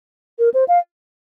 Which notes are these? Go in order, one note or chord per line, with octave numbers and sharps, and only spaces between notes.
A#4
C5
F5